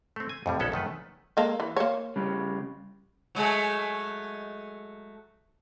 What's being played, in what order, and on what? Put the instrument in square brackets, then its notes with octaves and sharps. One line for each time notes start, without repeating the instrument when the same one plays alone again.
[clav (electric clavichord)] A3 C4
G#5
F2 A2 G3
A#1 B3 C#4 A4
F#2 D#3 A3 B4
[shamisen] G#3 A#3 A4
E3
A#3 C#5
[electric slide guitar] C#3 G3
[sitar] F#3 G#3 A3